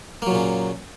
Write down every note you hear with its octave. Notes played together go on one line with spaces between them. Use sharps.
A#2 C#3 F#3 A#3